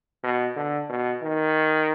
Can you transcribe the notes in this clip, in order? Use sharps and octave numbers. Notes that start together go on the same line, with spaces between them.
B2
D3
B2
D#3